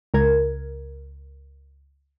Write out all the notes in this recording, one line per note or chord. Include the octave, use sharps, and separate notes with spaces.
C#2 A#4 G#6